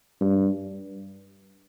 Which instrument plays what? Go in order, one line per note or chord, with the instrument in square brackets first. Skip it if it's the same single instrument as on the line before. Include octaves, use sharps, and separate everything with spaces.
[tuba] G2